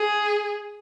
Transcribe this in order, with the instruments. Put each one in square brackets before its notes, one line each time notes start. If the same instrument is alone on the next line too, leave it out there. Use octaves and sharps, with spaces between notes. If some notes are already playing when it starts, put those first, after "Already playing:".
Already playing: [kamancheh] G#4